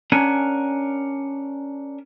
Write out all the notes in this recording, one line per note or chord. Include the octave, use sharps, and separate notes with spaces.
C#4 D4 A#4 F#5 G#5